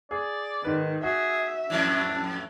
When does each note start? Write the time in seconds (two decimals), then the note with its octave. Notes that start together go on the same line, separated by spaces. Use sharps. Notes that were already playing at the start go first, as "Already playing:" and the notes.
0.11 G#4 D5
0.64 G#2 D#3 B4
1.03 F#4 G#4 E5
1.70 F2 A2 E3 D4